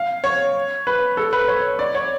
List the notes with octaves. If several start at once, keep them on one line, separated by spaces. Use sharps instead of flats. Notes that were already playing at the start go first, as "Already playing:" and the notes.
Already playing: F5
C#5
B4
A4
B4
C#5
D5
C#5